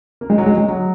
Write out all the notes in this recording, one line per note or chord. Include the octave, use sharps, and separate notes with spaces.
A#3
G#3
F#3
G#3
G#3
F#3